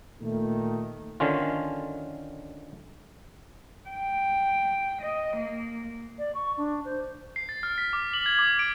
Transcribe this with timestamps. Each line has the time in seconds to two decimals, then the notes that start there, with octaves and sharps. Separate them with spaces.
0.20 A#2 D#3 A3
1.20 D3 D#3 C#4 F4
3.90 G5
5.01 D#5
5.37 A#3
6.18 D5
6.35 C#6
6.57 D4
6.85 C5
7.36 C7
7.49 A6
7.63 F6
7.78 B6
7.93 D6
8.13 F#7
8.26 G#6
8.39 D6
8.59 D7